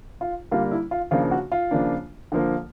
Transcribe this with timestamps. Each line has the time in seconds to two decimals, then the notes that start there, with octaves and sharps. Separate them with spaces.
0.21 F4
0.51 D3 G3 A#3 D4 F4
0.71 E4
0.91 F4
1.11 C#3 F3 A#3 D4 F4
1.31 F#4
1.52 F4
1.71 C#3 F3 A#3 D4
2.32 D3 F3 A#3